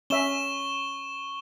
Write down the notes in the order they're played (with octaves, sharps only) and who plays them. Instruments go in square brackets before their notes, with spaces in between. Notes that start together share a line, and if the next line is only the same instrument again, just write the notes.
[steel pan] C#4 E5 [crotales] C#6 E7 G7